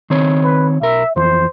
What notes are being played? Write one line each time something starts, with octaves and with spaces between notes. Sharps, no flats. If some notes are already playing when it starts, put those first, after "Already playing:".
D#3 C4 C#5
B4
B1 A#4 E5
F2 E3 C5